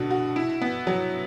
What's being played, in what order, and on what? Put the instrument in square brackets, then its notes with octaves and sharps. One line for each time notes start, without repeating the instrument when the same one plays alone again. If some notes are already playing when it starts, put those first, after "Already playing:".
Already playing: [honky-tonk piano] B2 D3 F#4
F#4
E4
B3
F#3